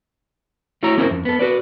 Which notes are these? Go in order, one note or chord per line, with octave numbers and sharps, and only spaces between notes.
A3 E4 F#4 C#5 A#5
A#3 C#4 E4 A#4 C5 E5
F2
B3 A4
F#4 B4 D5